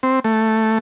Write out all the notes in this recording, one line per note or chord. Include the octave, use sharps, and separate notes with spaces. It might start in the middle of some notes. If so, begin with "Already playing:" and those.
C4
A3